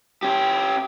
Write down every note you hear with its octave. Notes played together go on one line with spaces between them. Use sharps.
C#4 G4